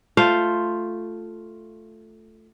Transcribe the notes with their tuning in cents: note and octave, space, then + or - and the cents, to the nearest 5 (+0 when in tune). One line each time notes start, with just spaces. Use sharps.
A3 +0 F4 +0 C5 +0